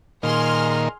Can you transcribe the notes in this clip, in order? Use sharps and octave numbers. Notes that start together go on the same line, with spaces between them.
A#2 D#3 G#4 C6 F6